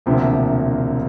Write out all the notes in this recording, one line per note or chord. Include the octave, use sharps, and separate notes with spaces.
E1 D2 C3 F3 A#3